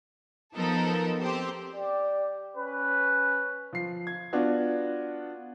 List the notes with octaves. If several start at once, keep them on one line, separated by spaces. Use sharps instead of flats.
F3 B3 D#4 A4 A#4
C4 G4 C5
G4 D5
C#4 B4
F3 C7
G#6
B3 D4 F4 F#4